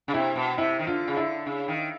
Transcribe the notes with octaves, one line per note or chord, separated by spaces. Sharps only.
C#3
C3 E4
B2
C3 E4
D#3
D3 F4
C#3
D3 E4
C#3
D#3